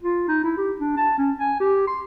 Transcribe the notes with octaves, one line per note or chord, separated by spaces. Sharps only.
F4
D#4
E4
G4
D4
A5
C#4
G#5
G4
C6